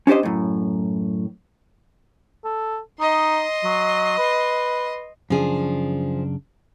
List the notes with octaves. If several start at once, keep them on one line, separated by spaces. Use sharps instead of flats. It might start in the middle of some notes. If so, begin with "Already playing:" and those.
C#4 D4 G4 C5 D#5
F#2 A2
A4
D#4 D#5 C6
F#3
B4
F#2 C#3 F3 D4 G#4